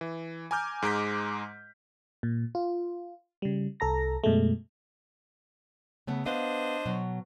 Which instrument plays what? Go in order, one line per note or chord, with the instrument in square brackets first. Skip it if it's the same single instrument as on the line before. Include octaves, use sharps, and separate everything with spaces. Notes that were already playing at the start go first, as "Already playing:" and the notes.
[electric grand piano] E3
G#5 A#5 D6 F6 G6
G#2 G#3 A#5 D6 G6 B6
[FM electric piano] A#2
F4
C#3 G3
C2 A4 A#5 A#6
F#2 B2 G#3 A3
[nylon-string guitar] C#3 A3 B3
[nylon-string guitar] B3 B4 F5 [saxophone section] D4 C5 D#5
[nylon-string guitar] B2 F#3